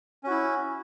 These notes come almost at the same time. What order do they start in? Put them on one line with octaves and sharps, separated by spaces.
C#4 F#4 E4